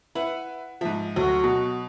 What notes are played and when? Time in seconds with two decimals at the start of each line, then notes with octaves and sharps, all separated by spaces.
0.15 E4 B4 F#5
0.81 G#2 F3 E5
1.16 D2 F#3 F#4
1.44 B2